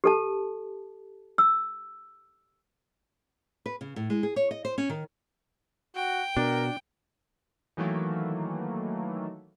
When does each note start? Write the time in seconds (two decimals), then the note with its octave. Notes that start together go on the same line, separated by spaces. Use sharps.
0.04 G4 A4 A5
1.38 E6
3.66 B4
3.81 C#3
3.96 A2
4.10 G#3
4.23 G#4
4.36 C#5
4.51 D#5
4.65 C5
4.78 C#4
4.89 D#3
5.95 F#4 G5
6.37 B2 D4 A#4
7.77 D#3 E3 F#3 A3 A#3